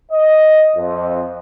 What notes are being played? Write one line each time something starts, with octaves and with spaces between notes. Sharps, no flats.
D#5
F2